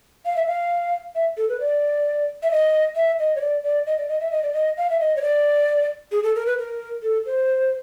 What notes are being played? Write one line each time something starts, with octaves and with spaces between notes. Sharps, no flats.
F5
E5
F5
E5
A4
B4
D5
E5
D#5
E5
D#5
C#5
D5
D5
D#5
D5
D#5
E5
D#5
D5
D#5
F5
E5
D#5
C#5
D5
G#4
A4
A#4
B4
A#4
A4
C5